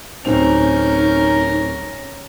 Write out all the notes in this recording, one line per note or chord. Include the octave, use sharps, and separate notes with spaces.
D1 C4 C#4 D#4 A#4 F7